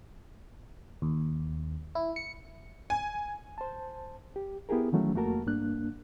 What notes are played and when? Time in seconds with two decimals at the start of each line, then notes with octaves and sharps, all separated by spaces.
1.02 D#2
1.95 E4
2.16 C#7
2.90 G#5
3.58 C5 A5
4.36 G4
4.69 B3 E4 G4 G#4 A#4
4.92 D#3 E3 F#3 A3 C#4
5.15 F2 A3 A#3 F#4 A#4 A5
5.47 G2 A#3 D4 F#6